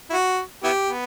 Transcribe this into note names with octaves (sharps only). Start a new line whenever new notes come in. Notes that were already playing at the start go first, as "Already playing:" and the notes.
E4
F#4
B3 E4 G4
B3